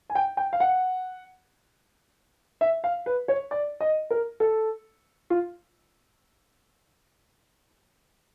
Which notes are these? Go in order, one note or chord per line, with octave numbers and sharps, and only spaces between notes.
G#5
G5
G5
F5
F#5
E5
F5
B4
C#5
D5
D#5
A#4
A4
F4